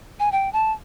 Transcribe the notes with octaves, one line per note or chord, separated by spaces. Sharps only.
G#5
G5
A5